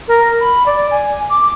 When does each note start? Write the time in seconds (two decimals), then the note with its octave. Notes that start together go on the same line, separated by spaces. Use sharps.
0.08 A#4
0.40 B5
0.66 D5
0.91 G#5
1.29 D6